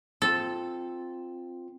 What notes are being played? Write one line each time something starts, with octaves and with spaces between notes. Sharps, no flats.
C4 F4 A4